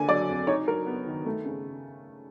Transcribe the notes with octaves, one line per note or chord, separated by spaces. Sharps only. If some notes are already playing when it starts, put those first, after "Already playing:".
Already playing: D3 A#3 G#5
F#3 D5
F2
D#4 C#5
F#3 A#4
B3
D#3
A3
C#3